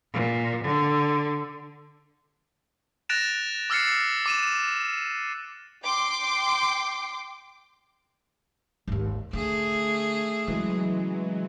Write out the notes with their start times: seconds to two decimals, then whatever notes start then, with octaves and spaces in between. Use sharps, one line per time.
0.13 A#2
0.64 D3
3.09 F#6 A6 A#6 D7 E7 F7
3.70 D6 E6 F6 A6 C7 C#7
4.26 D6 D#7 E7
5.84 G5 C6 D6
8.88 G#1 D#2
9.33 D3 A3 G#4
10.47 C#3 E3 F#3 G#3